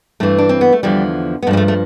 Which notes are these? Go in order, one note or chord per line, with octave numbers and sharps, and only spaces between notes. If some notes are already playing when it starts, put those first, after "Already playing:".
G2 E3 A3
D4
C4
B3
A3
E2 D3 F3 G3
B3
G2 F3 G3 A3
A3
A3